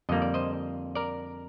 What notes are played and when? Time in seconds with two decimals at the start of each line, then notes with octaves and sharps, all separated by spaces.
0.09 F2 D3 G3 A#3 D#5
0.22 D5
0.34 C5 D#5
0.95 A#4 D5